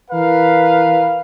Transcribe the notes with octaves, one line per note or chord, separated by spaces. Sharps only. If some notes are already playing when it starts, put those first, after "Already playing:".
E3 A#4 B4 F5